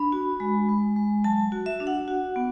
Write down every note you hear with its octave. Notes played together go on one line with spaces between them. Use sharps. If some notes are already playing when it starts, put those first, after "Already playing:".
Already playing: D4 B5
F#4
G#3
G#3
G#3
F#3 A5
F#4
E5
D4
F#5
F#4
B3